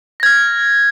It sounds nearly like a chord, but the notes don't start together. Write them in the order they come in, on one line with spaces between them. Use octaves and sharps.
A#6 G#6 F6